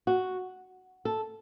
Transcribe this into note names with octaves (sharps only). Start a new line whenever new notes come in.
F#4
A4